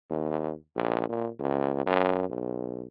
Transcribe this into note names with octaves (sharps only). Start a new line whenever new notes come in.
D#2
A#1
A#2
C#2
F#2
B1